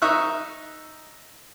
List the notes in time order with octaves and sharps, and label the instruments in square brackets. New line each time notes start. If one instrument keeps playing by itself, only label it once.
[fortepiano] D#4 E5 C#6 D#6 F#6